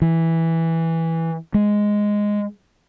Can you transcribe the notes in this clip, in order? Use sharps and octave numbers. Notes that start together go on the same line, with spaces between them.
E3
G#3